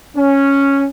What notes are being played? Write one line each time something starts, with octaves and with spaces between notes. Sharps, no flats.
C#4